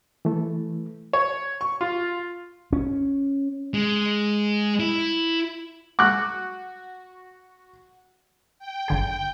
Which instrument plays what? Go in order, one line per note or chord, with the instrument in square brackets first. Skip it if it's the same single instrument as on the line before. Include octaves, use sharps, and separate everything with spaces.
[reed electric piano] E3 A3
[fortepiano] C#5
C#6
F4
[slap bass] C#4
[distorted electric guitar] G#3
E4
[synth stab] F#4 [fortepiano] D6 F#6
[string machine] G5
[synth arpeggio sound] G1 D3 G#4